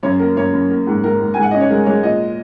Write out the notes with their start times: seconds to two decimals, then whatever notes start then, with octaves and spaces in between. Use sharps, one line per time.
0.03 F#2 C#5
0.19 A#3 A#4
0.36 F#2 C#5
0.53 F#2
0.70 A#3
0.87 G#2
1.03 G#2 A#4
1.20 G#2
1.34 G#2 G#5
1.43 F#5
1.51 C#4 D#5
1.61 C#5
1.70 G#3 A#4
1.86 G#3 C#5
2.03 A#2 D#5